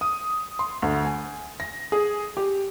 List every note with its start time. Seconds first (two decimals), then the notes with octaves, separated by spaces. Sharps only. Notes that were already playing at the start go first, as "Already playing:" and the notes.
0.01 D#6
0.59 C6
0.82 D2
1.05 G#5
1.60 A#6
1.92 G#4
2.37 G4